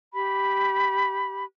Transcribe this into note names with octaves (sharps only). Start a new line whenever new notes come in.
G4 B5